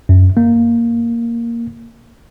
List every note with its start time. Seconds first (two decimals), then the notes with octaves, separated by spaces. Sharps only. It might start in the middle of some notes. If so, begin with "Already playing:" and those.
0.09 F#2
0.37 A#3